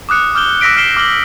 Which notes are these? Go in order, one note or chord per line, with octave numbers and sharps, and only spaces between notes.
D6 D#6 F#6 C#7
D6 F6 G6 G7
D6 E6 A#6 B6 D7
F6 F#6 C7 D7 E7 G7
D6 F6 F#7 G7